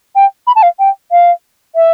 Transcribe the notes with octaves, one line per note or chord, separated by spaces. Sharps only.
G5
B5
A5
F5
G5
F5
E5